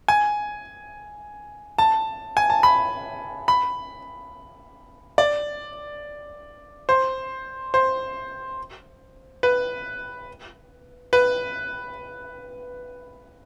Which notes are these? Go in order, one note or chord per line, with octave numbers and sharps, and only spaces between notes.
G#5
A5
G#5
A5
B5
B5
D5
C5
C5
B4
B4